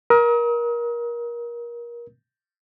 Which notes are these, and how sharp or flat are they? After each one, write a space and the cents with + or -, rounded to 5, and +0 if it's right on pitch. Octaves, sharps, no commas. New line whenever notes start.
A#4 +25 D#6 +40